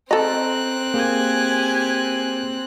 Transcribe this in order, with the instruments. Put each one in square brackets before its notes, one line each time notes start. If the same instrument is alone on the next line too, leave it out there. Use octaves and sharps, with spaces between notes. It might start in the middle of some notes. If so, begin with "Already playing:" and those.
[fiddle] C4 F#6 [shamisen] A4 D#5 [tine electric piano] A#5
[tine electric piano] A#3 G#4 [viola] G4 G#5